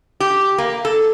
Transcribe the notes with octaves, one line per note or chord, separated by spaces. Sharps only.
G4
A#3
A4